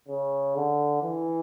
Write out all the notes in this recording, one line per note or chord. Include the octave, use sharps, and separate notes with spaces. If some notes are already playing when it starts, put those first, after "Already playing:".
C#3
D3
E3